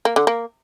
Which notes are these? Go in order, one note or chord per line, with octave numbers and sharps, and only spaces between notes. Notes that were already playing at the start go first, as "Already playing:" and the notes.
A#3
D3
A#3